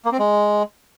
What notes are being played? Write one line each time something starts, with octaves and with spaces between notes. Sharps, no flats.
A#3
C4
G#3